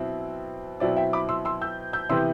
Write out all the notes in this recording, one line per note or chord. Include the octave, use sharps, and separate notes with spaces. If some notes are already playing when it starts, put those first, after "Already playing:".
Already playing: B2 F#3 C4 E4
B2 F#3 C4 E4 D5
E5 G5
B5 D6
C6 E6
C6 E6
E6 G6
E6 G6
C3 E3 B3 E4 C6 E6